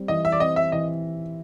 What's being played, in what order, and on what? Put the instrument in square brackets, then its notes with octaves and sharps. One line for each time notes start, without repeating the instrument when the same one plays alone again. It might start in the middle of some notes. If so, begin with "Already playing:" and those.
Already playing: [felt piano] G3 C4
[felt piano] E3 [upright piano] D#5
[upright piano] E5
D5
[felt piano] C4 [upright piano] D#5
[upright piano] E5
[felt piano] E3 [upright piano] D#5